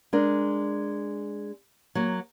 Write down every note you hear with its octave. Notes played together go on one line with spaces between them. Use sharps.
G#3 D4 A#4
F#3 A#3